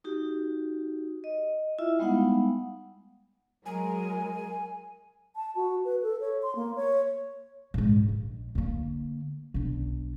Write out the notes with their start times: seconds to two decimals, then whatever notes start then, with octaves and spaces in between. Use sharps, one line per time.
0.04 D#4 F#4 G4
1.24 D#5
1.79 E4 F4 E5
1.99 G3 G#3 B3 D#4 F5 F#5
3.66 F#3 G#3 A#4 G#5
5.36 A5
5.56 F#4
5.85 B4
6.03 A4
6.20 C#5
6.42 C6
6.56 A#3
6.76 C#5
7.74 A#1 G#2
8.09 A#1
8.55 D3 A#3
9.54 B1 D4